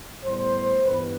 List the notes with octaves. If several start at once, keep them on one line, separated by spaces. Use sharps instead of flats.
A2 G3 B3 C5
G2 E3 G3 B3 B4